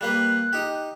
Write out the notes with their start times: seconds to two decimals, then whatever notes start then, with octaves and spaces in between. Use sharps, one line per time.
0.01 G3 A#3 B4 F#6
0.53 D#4 G4